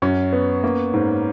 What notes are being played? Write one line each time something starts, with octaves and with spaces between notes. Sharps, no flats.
F#2 C#4
B3
A#3
G#2